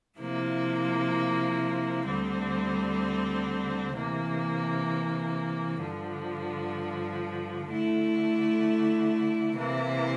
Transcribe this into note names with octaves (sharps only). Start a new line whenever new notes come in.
C3 F3 A#3 E4
D2 D3 G3 C4
C3 E3 A#3
G2 D3 F3
D3 A3 E4
C3 E3 A#3 E4